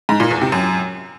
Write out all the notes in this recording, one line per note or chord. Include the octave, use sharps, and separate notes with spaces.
G#2
A#2
E2
C3
F#2